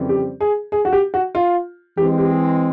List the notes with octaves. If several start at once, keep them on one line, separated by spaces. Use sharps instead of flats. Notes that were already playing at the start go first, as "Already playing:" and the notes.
Already playing: F2 C#3 E3 G3 C4
G4
G#4
G#4
F#4
G4
F#4
F4
E3 G#3 C4 G4
G4